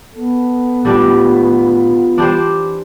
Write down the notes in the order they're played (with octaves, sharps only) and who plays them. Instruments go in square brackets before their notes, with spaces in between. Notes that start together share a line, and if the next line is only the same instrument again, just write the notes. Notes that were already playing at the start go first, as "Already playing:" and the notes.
[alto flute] B3 [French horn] A4
[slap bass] A2 D#3 [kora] G3 D4 G4 [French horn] F4
[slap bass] E3 [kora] D4 G4 C5